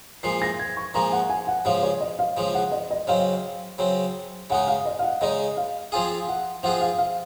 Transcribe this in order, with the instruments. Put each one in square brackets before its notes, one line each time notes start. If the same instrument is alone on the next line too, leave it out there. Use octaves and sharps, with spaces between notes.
[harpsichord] A#2 F3 G#3 [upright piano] C7
[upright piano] A#6
G#6
C#6
[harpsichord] A#2 F3 G#3 [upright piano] A#5
[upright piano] F#5
G#5
F#5
[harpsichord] C#3 F3 G#3 [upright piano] F5
[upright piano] C#5
D#5
F5
[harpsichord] C#3 F3 G#3
[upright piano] F#5
D#5
D#5
[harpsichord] C#3 F#3 C4 [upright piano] F5
[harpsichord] C#3 F#3 C4
[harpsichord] C#3 G#3 D#4 [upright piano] F#5
[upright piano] F5
D#5
F5
F#5
[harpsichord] C#3 G#3 D#4 [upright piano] D#5
[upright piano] F5
[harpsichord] F3 C4 F4 G#4 [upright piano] G#5
[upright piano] F#5
[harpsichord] F3 C4 F4 G#4 [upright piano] F#5
[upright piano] F5
F5